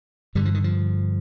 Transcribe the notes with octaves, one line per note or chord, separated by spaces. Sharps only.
G2 D3 G3
F3
D#3
F3